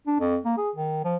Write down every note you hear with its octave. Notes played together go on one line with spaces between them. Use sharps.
D4
F2
A#3
G#4
D#3
F3